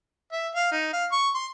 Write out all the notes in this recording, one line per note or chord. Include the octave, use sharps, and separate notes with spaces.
E5
F5
D#4
F5
C#6
C6